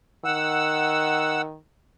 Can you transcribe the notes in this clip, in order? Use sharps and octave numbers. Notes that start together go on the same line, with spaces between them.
D#3 F#5 E6